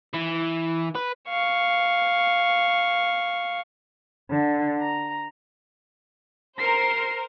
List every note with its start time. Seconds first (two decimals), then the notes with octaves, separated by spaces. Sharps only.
0.14 E3
0.95 B4
1.29 F5 C#6
4.30 D3
4.78 A#5
6.59 A#4 C5 C7